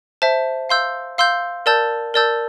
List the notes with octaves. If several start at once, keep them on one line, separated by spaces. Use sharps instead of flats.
C5 E5 A5
F5 C6 E6 G6
F5 C6 E6 G6
A#4 D5 A5 E6 G6
A#4 D5 A5 E6 G6